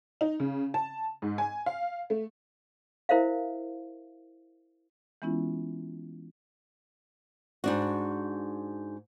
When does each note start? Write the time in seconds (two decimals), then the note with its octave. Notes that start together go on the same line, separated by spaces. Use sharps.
0.21 D#4
0.40 C#3
0.74 A5
1.22 G#2
1.38 G#5
1.66 F5
2.10 A3
3.09 E4 A#4 C5 E5 F5
5.22 E3 G#3 B3 C#4 E4 F4
7.64 G#2 D4 F#4